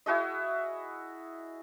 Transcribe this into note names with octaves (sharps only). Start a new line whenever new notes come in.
E4 F#4 G#4 D#5